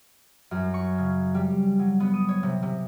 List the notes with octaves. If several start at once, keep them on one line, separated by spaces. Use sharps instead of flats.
F#2
C#6
C#3
G3
F#3
B3
D#6
C#5
C3
C3